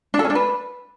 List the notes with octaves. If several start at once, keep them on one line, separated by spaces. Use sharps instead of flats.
D4
A4
C#4
D4
B4